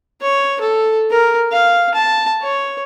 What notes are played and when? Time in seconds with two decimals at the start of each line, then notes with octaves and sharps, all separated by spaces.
0.21 C#5
0.61 A4
1.11 A#4
1.52 F5
1.94 A5
2.42 C#5